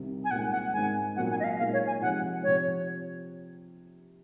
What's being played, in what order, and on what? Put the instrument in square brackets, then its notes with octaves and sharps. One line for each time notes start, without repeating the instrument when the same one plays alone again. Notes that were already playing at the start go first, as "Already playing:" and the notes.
Already playing: [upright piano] C2 C3 D#3
[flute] G#5
[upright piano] C2 A#2 G#3 C4 D#4 [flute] F#5
[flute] F#5
[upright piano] G#2 D#3 G#3 C4 [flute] G#5
[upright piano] A#2 F#3 C4 D#4 [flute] F#5
[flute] G#5
D#5
F5
[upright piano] A#2 G#3 D#4 [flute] F5
[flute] C#5
G#5
[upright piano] C3 F3 G#3 D#4 [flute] F#5
[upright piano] C3 F3 C4 [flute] C#5